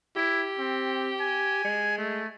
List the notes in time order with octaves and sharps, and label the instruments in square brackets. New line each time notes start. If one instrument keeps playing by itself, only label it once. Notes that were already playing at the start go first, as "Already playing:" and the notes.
[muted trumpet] E4 [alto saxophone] G4
[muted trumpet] C4
G#5
[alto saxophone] G#3
[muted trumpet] A3